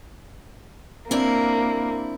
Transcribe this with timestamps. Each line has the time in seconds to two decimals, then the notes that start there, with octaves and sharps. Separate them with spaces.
1.11 A#3 C4 D4 E4